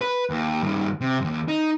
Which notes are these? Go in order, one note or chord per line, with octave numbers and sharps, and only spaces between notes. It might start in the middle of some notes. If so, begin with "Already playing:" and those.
B4
D#2
G2 D#3
C3
D#2 G#2
D#4